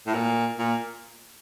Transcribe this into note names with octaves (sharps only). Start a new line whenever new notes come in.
A2
A#2
A#2